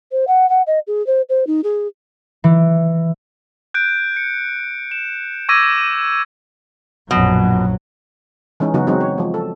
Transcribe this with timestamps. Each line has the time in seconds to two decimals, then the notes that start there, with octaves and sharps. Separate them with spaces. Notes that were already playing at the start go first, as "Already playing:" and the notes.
0.12 C5
0.28 F#5
0.49 F#5
0.67 D#5
0.87 G#4
1.07 C5
1.29 C5
1.47 D#4
1.64 G#4
2.44 E3
3.74 F#6 G6 D7
4.17 C#7
4.91 E7
5.49 C#6 D6 E6 G#6 A#6 D#7
7.11 A#1 F#2 B2 F#3
8.60 E3 G#3 C#4 D#4
8.74 C#3 F#3 B3 D#4 F#4
8.87 F#3 G#3 C4 D#4 F#4
9.01 C#5
9.18 F3 G#3
9.34 A4